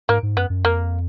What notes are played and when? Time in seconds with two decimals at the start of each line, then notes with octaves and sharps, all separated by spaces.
0.09 G#2 A#3
0.23 G#2
0.37 F#2 B3
0.50 F#2
0.64 F2 A#3